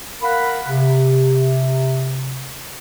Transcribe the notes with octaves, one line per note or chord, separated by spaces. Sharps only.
A#4 F5 F#5 B5
C3